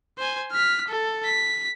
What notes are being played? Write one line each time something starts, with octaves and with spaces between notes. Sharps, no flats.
C5 G#5
F6 B6
A4
B6